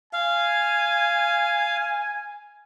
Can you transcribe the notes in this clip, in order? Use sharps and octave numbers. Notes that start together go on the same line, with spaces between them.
F5 G#5